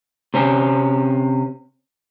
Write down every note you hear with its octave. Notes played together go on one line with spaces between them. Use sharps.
C3 C4 C#4